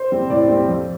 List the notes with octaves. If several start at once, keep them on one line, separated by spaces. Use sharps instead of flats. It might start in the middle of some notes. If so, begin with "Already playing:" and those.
Already playing: C5
G3 C4
A2 D5
G3 C4
F2